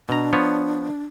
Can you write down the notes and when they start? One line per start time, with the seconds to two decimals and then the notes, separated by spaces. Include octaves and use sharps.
0.09 B2 D4 A#5
0.33 F3 B3 C#5